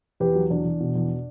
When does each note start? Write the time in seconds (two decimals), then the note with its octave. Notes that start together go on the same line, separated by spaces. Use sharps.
0.20 E2 G4 B4
0.35 F#3
0.50 E2 D4
0.65 E2
0.80 B2
0.95 E2